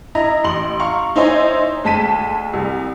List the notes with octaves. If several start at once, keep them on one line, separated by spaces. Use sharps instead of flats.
E4 D#5 A#5
A1 C6 F#7
F5 A#5 C#6
D#4 E4 C5 C#5 D#5 G#5
D2 G#3 A5 B6 D#7
C2